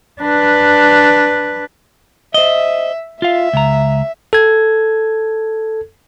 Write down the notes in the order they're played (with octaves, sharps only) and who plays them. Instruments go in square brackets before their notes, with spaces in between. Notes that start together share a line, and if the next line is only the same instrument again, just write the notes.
[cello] D4 B4
[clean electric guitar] C5 D#5 [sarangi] E5
[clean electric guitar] F4 F5 [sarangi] E5
[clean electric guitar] C#2 A#5
[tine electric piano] A4 G#6